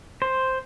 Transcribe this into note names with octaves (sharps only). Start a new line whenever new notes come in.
C5